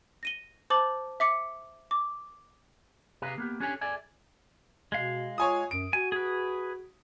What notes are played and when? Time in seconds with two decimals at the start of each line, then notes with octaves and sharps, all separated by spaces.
0.23 A#6 D#7 G7
0.70 C5 A5 D6 A6 F#7
1.20 E5 D6 C#7
1.91 D6
3.22 C3 G4 G#4 B4 F5 A#5
3.38 A#3 B3 G4
3.60 C#4 D4 G4 A4 C#5 G#5
3.81 G#4 A4 D5 E5 G#5
4.92 B2 G#3 F5
5.38 F4 C#5 G#5 D#6
5.71 F#2 D7
5.93 F#4 G#5
6.12 G#4 B4